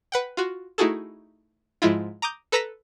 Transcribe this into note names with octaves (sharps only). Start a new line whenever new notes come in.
B4 F#5 G5
F4 F#4
A3 D#4 E4 F#4 G#4 A4
G#2 F3 G#3 E4 F4
A#5 D6 D#6 G6
A4 B4 A#5 E6 A#6 B6